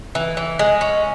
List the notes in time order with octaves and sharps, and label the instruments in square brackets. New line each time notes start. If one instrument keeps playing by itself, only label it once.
[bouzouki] E3
E3
G#3
C#4